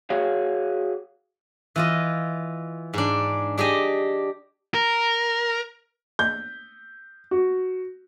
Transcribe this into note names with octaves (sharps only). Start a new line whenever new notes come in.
F#4 G#4 C#5 F5
E3 F4 D#5
G#2 D4
D4 G4 G#4 D#5
A#4
G6
F#4